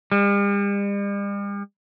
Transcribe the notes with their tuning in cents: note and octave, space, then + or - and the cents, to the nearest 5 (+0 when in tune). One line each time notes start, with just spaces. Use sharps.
G3 +45